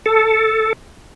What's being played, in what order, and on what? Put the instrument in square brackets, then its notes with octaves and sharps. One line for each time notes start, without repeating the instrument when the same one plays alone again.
[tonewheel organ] A4